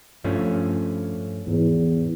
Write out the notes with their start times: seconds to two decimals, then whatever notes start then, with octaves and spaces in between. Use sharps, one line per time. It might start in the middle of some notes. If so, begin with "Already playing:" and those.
0.24 G2 F3 A3 C#4
1.47 E2 G#2